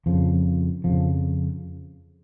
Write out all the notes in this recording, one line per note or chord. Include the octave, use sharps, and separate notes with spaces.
F2 C#3 F3
F2 C#3 F3